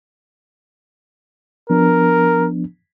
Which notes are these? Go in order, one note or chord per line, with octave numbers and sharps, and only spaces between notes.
F3 B3 D4 A#4